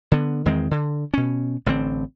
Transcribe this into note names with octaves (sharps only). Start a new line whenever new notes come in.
D3 B3
E2 D#3 G#3 C4
D3
B2 C#4
A1 D3 F#3 C4